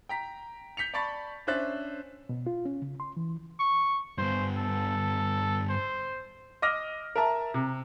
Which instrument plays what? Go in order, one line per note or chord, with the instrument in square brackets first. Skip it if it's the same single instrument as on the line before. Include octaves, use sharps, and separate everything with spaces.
[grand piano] G5 A#5 B6
G6 B6 C#7 F7
D5 A5 B5 C#6 A6
C#4 D4 C5 E5 F#6 A6
[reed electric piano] B2
F4
C#4
C#3
C6
E3
[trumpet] C#6
[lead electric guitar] G2 B3 [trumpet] C5
[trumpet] A4
C5
[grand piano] D#5 D6 E6 F6 A#6
A#4 E5 A5 A#5
C3